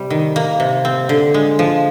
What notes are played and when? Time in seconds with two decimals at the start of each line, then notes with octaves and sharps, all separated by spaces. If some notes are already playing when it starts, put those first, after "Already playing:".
Already playing: C3 G3
0.10 D#3
0.36 A#3
0.60 C3
0.85 C4
1.09 D3
1.34 G#3
1.59 F3